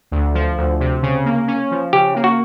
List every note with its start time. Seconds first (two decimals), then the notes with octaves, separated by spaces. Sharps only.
0.11 D2
0.35 F3
0.57 D2
0.80 C3
1.02 C#3
1.25 A#3
1.47 C#4
1.71 F3
1.93 C#3 G4
2.16 A#3
2.24 F#4